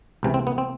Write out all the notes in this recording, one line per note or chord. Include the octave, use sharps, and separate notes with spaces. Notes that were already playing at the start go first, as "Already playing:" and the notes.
C#2 C3 E3
C4
B3
C4